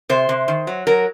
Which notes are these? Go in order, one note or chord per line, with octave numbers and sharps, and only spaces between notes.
C3 C5
C3
D#3
F#3
F#3 A#4